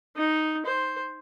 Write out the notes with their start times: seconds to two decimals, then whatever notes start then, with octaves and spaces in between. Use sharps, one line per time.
0.16 D#4
0.66 C5